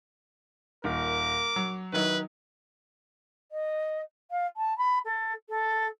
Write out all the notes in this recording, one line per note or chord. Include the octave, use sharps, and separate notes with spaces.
D#1 D#3 A#4 D6
F#3
D#3 F#3 D#4 E4 B4
D#5
F5
A5
B5
A4
A4